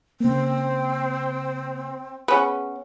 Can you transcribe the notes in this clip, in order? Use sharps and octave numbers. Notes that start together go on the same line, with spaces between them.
C#3 A#3 C4
B3 C#4 G#4 F#5